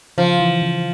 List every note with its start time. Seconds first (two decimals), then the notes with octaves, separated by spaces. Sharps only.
0.18 C#3 F3
0.39 E3
0.62 C#3